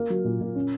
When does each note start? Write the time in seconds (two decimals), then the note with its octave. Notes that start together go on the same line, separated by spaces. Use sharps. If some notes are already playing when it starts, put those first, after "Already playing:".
Already playing: A#3
0.10 F#3
0.25 A#2
0.41 A#2
0.55 C#4